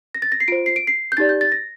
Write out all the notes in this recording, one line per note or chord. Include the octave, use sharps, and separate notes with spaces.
A#6
A6
A#6
C7
F4 C5 D7
C7
D7
C7
G6
D#4 G4 D5 A6
G6
A6
A#6